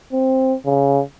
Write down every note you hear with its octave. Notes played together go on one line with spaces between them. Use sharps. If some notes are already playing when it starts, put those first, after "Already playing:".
C4
C#3